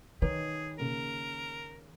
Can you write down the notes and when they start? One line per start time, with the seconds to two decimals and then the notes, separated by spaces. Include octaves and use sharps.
0.22 D#3 D#4 G#4 B4 C#5
0.79 C#3 A#3 A#4